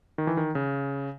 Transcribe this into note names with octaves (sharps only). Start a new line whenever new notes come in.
D#3
E3
D#3
C#3